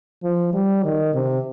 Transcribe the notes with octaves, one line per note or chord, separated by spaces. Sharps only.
F3
G3
D#3
C3